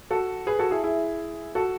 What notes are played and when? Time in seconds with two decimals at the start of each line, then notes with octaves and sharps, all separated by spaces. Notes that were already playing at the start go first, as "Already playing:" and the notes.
0.11 F#4 A4
0.47 G#4 B4
0.59 F#4 A4
0.71 E4 G#4
0.83 E4 G#4
1.55 F#4 A4